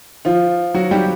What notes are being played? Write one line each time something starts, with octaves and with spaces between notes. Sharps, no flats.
F3 F4
F#3 F#4
G3 G4